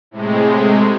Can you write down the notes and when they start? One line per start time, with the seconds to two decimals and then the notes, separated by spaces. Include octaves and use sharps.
0.11 A2 C3 G#3